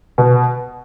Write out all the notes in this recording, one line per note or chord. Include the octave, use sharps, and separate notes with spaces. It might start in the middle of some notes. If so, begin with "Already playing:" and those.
B2